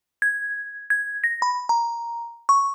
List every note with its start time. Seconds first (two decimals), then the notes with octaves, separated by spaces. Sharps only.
0.22 G#6
0.90 G#6
1.24 A#6
1.42 B5
1.69 A#5
2.49 C#6